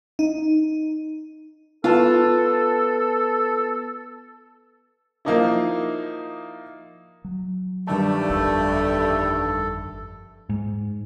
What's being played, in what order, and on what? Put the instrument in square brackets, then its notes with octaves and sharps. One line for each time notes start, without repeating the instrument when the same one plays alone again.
[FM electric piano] D#4
[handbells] B3 B4 A5 [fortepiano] F4 [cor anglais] A4
[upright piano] F3 A#3 D#4 E4
[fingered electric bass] F#3
[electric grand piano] G2 D#3 A5 [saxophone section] G3 A3
[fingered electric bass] G1 F2 [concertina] A4
[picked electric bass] G#2